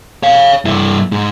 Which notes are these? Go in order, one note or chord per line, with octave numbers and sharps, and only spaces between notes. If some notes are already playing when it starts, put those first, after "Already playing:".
C#5 F5
G2 E4
G#2 G#3